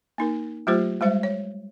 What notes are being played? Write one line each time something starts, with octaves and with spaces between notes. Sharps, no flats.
A#3 D#4 A#4
F#3 A3 F4 G4 C5
G3 G#3 C5 E5
C#5